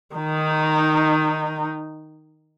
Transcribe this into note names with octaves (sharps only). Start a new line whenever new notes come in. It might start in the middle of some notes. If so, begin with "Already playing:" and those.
D#3 D#4